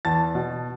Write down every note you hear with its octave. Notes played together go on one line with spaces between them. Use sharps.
E2 A5 A6
B2